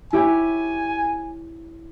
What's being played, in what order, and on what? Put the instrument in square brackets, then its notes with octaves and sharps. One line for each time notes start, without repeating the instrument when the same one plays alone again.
[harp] E4 G4 C#5 [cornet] G#5